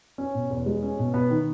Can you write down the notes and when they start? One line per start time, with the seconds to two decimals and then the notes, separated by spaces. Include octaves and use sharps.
0.18 C#4
0.35 B2
0.51 E2
0.66 G#3
0.83 C#4
0.99 B2
1.14 B3
1.30 D#3